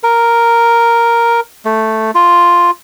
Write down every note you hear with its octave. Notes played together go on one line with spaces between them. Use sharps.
A#4
A3
F4